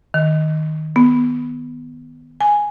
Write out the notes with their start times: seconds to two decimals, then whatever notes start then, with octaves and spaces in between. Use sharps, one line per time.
0.14 D#3
0.96 B3
2.41 G#5